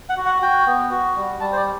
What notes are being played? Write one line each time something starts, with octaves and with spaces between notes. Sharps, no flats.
F#5
F#4
F#5
F#4 G5
B3
F#4
G3
G3 A5
C5
D5